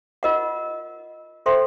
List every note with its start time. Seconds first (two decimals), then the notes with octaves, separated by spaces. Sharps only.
0.23 F4 A#4 D#5 F#5
1.46 A4 C5 E5 G5 C6